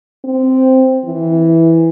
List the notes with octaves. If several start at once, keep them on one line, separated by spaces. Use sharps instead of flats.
C4
E3